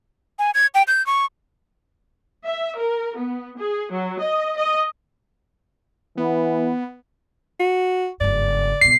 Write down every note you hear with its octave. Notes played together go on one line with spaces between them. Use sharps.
G#5
G#6
G5
G6
C#6
E5
A#4
B3
G#4
F#3
D#5
D#5
E3 B3
F#4
F#1 G2 D5
G2 B2 C7